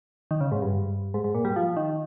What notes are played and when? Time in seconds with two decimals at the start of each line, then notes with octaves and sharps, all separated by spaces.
0.31 D#3
0.41 C#3
0.52 G#2
0.62 G2
1.14 G#2
1.24 G#2
1.35 A#2
1.45 G3
1.56 F3
1.77 D#3